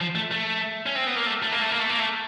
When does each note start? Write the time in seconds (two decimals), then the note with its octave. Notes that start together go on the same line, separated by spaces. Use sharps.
0.01 F3
0.15 A3
0.31 A3
0.86 C#4
0.95 C4
1.07 B3
1.16 A#3
1.26 A3
1.42 A3
1.52 A#3
1.62 A3
1.71 A#3
1.80 A3
1.90 A#3
2.00 A3